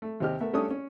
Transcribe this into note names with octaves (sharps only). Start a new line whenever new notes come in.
A3
D#2 C3 C4 G4 D#5 F6
A3 B3 A#4 E5
G3 A3 C#4 D4 A4 D#6
C#4